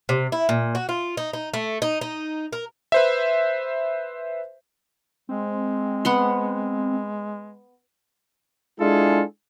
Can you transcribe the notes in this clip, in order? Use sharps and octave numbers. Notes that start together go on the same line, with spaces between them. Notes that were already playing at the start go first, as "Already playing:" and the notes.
C3
E4
A#2
F#4
F4
D#4
D#4
A3
D#4
D#4
A#4
B4 C5 E5
G#3 C4
B3 F#5 C6
G#3 D4 E4 F4 G#4 A4